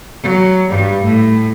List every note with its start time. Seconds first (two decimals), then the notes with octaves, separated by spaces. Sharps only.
0.23 F#3
0.70 G2 G3
1.03 A2